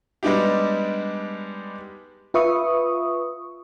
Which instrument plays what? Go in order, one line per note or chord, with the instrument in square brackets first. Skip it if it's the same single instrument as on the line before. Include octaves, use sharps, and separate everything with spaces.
[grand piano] G3 G#3 B3 D4 D#4 G4
[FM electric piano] F4 B4 E5 C#6 D#6